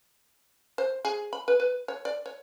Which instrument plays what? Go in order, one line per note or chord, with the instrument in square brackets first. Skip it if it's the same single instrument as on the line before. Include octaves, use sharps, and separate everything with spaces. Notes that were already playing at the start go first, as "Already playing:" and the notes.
[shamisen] C5
G#4
B5
B4
B4
C#5
D5
C#5